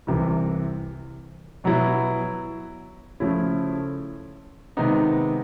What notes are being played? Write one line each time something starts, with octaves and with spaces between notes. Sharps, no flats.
C2 C3 E3
B2 F#3 B3 E4
C#3 F3 A3 C#4 E4
C3 D#3 G#3 B3 D#4